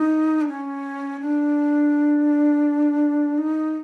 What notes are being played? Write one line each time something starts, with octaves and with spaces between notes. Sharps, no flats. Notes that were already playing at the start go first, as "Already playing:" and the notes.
Already playing: D#4
D4
C#4
D4
D#4